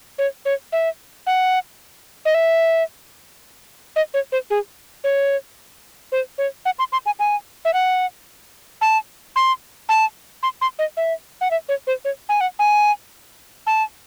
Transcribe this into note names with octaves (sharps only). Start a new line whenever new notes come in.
C#5
C#5
E5
F#5
D#5
E5
D#5
C#5
C5
G#4
C#5
C5
C#5
F#5
C6
C6
G#5
G#5
E5
F#5
A5
C6
A5
C6
C6
D#5
E5
F#5
E5
C#5
C5
C#5
G#5
F#5
G#5
A5